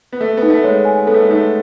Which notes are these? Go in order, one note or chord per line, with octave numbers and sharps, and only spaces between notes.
B3
A3 A4
B3
D#4
A3
G#3 C#5
G#5
B3 A4
A3
G#3
A3 D#4